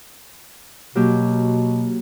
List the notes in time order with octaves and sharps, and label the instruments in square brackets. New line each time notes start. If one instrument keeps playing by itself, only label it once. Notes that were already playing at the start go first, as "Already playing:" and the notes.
[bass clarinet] B2 [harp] F#3 A#3 G4